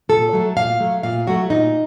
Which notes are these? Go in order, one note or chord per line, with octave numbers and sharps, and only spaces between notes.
A#2 A4
F#3 A3
A#2 F5
F#3 A3
A#2 F5
F#3 A3 F#4
A#2 D#4